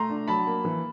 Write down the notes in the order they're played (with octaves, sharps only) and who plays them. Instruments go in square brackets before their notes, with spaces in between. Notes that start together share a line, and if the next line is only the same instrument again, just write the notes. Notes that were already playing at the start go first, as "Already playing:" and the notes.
Already playing: [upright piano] A3 [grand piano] A#5 C6
[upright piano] D4
[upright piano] F#3 [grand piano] A5 B5
[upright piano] A#3
E3